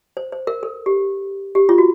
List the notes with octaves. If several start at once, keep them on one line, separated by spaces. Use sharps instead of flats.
C5
C5
A#4
A4
G4
G4
F4
F#4